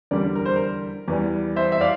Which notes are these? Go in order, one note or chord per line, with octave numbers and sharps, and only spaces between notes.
E2 D3 G3 A#4 D5
A#4
C5
A#4
E2 E3 G3
C5 E5
E5
D5 F5